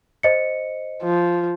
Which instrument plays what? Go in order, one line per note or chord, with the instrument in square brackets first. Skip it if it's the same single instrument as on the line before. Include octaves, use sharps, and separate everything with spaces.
[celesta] C5 D#5 C#7
[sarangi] F3